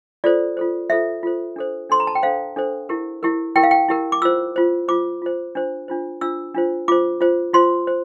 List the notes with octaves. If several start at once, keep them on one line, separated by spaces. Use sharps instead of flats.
F4 A4 C5 D5
F4 A4 C5
F4 A4 C5 E5
F4 A4 C5
D4 A4 C5
D4 A4 C5 C6
A#5
A5
G5
D4 A4 C5 F5
D4 A4 C5
E4 G4 A#4
E4 G4 A#4
E4 G4 A#4 G5
F5
G5
E4 G4 A#4
D6
F4 C5 E6
F4 C5
F4 C5 D6
F4 C5
D4 F4 C5
D4 F4 C5
D4 F4 C5 E6
D4 F4 C5
F4 C5 D6
F4 C5
F4 C5 C6
C5